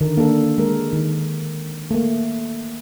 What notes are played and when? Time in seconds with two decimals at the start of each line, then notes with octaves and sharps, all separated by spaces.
0.01 D3 D#3 A#4
0.17 A#3 D4 A4
0.58 G#3 A#4
0.93 D#3
1.91 A3 A#3